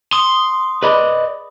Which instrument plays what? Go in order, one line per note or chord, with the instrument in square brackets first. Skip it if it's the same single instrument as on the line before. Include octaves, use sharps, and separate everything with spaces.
[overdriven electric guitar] C6 [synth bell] D#6
[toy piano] G#4 B5 [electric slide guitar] B4 D5 D#5